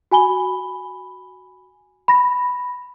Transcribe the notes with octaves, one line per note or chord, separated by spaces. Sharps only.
F#4 G#5 B5 G7
B5 A#6